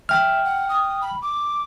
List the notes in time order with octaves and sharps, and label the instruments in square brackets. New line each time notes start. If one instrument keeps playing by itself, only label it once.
[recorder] E5 [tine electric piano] G5 F6
[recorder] F#5
D#6
B5
D6